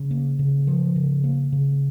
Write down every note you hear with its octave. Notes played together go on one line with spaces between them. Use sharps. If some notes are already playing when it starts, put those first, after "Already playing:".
Already playing: C#3
A#3
C#3
F3
C#3
A#3
C#3